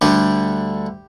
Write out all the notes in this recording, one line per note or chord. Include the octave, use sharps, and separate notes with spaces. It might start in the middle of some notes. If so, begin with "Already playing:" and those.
D2 D3 G3 G4